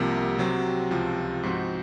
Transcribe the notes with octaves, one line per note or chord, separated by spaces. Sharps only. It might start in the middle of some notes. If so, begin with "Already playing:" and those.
Already playing: C2 C3 F3 A#3
C3 F#3 C4
C#2 C3 F3
G#2 F3 C4 F#4